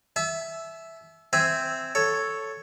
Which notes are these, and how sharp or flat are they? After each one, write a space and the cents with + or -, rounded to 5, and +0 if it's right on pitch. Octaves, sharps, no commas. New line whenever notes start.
E5 +0 A5 -45
C4 +0 E5 +0 G#5 +0
A4 +0 C#5 +0